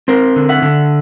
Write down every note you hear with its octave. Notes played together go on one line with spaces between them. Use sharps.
C4 A#4 C5
D3
E5 F#5
D3